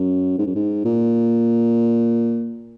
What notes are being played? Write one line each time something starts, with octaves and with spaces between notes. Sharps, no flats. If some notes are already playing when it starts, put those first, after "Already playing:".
Already playing: F#2
G#2
F#2
G#2
A#2